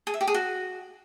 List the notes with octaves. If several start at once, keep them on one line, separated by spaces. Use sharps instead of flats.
G#4
E5
G4
G#4
F#4